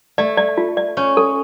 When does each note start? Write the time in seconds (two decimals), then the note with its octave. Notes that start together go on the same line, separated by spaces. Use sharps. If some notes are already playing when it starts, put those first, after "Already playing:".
0.18 A3 D5
0.37 D5
0.58 F4
0.77 D5
0.97 C#4 C#5
1.17 A4